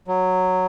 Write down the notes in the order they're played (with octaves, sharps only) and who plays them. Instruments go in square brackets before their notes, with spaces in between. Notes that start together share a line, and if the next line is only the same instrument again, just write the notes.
[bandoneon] F#3